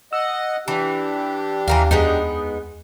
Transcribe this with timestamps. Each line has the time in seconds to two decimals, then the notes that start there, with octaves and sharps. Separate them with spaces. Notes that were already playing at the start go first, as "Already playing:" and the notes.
0.13 D#5 F#5 E6
0.68 E3 D4 G4
1.68 D#2 E3 A#4 F5
1.91 F2 G#3 B3 D#4